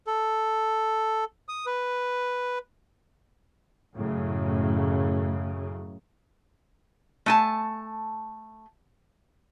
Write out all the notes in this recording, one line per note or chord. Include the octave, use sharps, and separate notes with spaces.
A4
D#6
B4
F#2 A2 C#3
A3 G#5 A5